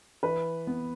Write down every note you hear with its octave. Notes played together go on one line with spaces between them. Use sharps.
E3 B4
B3